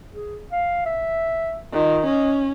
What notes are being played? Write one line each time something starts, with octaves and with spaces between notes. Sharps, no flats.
G#4
F5
E5
D#3 F4
C#4 D#5